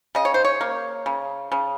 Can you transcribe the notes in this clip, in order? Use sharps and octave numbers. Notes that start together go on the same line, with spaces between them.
C#3 D#5
C#5
C5
C#5
A#3
C#3
C#3